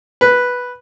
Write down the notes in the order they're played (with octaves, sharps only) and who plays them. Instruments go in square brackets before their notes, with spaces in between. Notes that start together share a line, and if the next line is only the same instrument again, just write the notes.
[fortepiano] B4